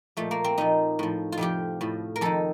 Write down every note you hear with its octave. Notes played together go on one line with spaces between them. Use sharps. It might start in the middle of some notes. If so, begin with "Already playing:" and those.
A#2 F3 A3
A#3
C4
A#2 F3 D#4
A2 F3
F4
F2 C3 F3 G4
A2 F3
A#4
F2 D#3 A4